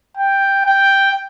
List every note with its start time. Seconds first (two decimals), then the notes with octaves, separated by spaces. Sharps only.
0.17 G5
0.66 G5